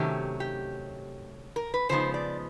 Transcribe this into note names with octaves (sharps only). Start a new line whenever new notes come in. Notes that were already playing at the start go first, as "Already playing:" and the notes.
Already playing: C3 D#3 F#3 A3 C#4 G4
G4
A#4
B4
C#3 F3 G#3 B3 D#4 C5
D5